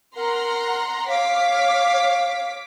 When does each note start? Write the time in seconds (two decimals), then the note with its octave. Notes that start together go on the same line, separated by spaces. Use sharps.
0.16 A#4 F#5 A#5 C6
1.09 C#5 F5 D6 B6